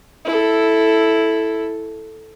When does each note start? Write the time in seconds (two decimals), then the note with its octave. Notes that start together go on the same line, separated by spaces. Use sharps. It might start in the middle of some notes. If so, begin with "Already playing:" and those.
0.25 E4 A4